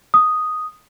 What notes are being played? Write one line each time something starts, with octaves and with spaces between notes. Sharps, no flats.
D#6